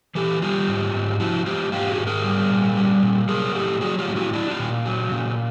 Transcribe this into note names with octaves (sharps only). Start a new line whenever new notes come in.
E3 G4 A4
G3 F4 G4
G#2
G#2
F3 E4 F#4
G#3 F4 G4
G#2 F4 G4
F#4 G#4
G#2
G#4 A#4
G3
A#2
G3
A#2
F#3 G#4 A#4
A2 G4 A4
F#3 F#4 G#4
F4 G4
A2
E4 F#4
F#3 D4 E4
D#4 F4
A#2
F#3
A#2